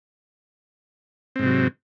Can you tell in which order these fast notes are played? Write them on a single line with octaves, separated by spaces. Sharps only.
C4 G#2 C3 F#3